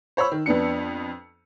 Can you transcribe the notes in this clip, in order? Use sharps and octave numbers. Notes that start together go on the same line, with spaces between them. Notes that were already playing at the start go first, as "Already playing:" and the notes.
C5 C#5 B5 E6
D#3
F2 B3 D4 C#7